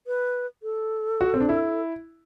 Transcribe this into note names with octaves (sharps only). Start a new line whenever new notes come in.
B4
A4
F#4
C4
D4
E4